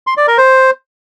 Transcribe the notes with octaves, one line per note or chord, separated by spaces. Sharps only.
C6
D5
A#4
C5